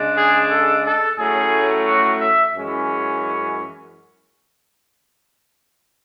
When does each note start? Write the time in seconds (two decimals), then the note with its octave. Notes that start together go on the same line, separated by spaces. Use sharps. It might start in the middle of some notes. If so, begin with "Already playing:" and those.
Already playing: C#3 G#3 D4
0.17 G#4
0.50 A4
0.85 A4
1.18 A2 F#3 A3 C#4 G#4
1.86 F#4
2.20 E5
2.55 F#2 E3 G#3 C#4